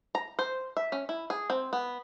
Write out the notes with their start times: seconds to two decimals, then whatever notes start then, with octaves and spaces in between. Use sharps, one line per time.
0.15 A#5
0.39 C5
0.77 E5
0.92 C#4
1.09 E4
1.30 G#4
1.50 C4
1.73 B3